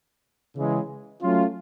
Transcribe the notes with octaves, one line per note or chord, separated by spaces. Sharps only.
C#3 E3 G#3
F#3 A3 C#4 F4